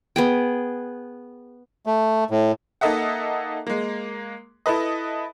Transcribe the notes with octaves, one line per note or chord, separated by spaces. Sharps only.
B3 G#4 G5
A3
A2
A#3 D#4 A4 D#5 E5 F#5
G#3 A#3
E4 A4 B4 D#5